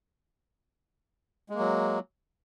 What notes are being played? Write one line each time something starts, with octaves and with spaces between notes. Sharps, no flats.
F#3 G#3 A#3